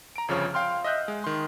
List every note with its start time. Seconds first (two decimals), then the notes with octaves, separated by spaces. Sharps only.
0.16 A#5 D7
0.28 G1 F2 C#3 F3 C#5 F6
0.54 F5 G5 C6 F6
0.84 D#5 E5 D#6 F#6 G6
1.08 G#3
1.24 D#3 C6